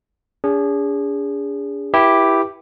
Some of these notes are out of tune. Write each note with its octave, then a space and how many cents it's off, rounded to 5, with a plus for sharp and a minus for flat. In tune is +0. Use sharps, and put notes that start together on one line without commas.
D4 -45 G#4 -25
E4 +0 G4 +0 B4 -35